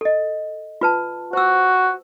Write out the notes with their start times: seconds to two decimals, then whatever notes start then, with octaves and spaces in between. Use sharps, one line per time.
0.01 A4 D#5
0.81 F4 B4 A5
1.33 F#4 C5 E6